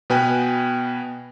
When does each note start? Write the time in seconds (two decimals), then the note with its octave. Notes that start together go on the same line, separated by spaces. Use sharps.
0.10 B2 B3 B4 G5 G#5 F#6